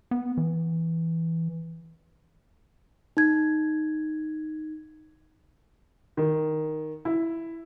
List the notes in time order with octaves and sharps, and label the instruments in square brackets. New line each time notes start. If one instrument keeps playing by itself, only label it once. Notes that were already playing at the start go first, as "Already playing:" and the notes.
[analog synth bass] B3
E3
[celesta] D#4 G#6
[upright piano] D#3
E4